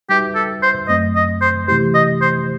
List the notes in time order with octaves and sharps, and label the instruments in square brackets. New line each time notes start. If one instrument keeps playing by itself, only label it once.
[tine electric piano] G3 D#4 F#4 B4 E5 [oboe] G4
[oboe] A4
C5
[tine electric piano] F#2 F#3 A3 C4 [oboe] D#5
[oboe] D#5
C5
[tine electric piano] C3 E3 A3 E4 G4 [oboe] C5
[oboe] D#5
C5